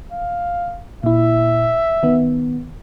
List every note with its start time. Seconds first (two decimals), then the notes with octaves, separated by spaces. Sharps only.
0.12 F5
1.03 A#2 E4 E5
2.03 D#3 B3